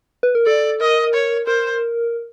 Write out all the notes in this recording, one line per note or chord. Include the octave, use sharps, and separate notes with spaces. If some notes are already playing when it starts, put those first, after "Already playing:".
B4
A#4
A4 D5
A#4 D#5
C#5
A#4 C5